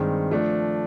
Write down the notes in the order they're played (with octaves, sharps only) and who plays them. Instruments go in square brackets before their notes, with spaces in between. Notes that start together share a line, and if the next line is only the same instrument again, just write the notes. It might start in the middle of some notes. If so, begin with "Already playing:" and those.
Already playing: [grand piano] G2 D#3 G#3 C4
F3 A3 D4